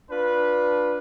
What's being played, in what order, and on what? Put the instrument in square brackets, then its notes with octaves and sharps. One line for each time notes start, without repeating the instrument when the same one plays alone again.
[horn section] D4 F4 B4